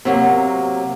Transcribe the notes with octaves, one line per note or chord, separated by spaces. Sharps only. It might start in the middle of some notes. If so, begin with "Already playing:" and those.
C3 F#3 A#3